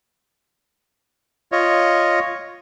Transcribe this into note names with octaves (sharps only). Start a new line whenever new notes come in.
F4 C#5 D#5